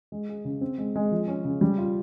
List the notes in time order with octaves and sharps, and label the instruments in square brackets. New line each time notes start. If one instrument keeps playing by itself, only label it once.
[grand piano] G#3
G#4
C#3
C4
G#3
G#3
F3
C#4
C#3
G3
F4